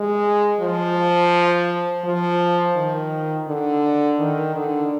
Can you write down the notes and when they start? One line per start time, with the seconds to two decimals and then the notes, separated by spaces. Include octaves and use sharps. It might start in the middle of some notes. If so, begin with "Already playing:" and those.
Already playing: G#3
0.60 F3
2.04 F3
2.76 D#3
3.47 D3
4.19 D#3
4.55 D3